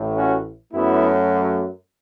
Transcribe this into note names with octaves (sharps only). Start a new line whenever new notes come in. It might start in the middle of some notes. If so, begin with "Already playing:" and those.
Already playing: A1 A2 A3
C#4 F#4
F#2 F#3 A3 B3 E4